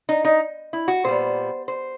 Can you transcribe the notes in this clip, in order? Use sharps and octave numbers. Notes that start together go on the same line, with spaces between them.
D#4
D#4
E4
F#4
A#2 G3 B3 C5
C5